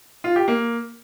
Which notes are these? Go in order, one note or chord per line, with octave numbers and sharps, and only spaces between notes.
F4
G4
A#3